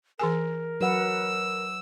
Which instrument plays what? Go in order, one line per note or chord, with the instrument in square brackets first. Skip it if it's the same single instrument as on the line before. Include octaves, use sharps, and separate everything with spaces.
[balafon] E3 G#4 G#5 [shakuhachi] A#4
[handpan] F#3 B4 F#5 [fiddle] E6